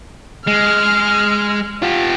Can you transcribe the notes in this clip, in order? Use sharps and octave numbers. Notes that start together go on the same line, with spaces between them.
G#3 F6
F4 G4